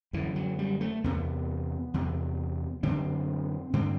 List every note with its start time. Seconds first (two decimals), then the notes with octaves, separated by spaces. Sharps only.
0.13 F#2 D3 E3
0.36 F#3
0.59 G3
0.81 A3
1.04 E2 C3 B3
1.94 E2 C3
2.83 F#2 D3 C4
3.73 G2 D3 C4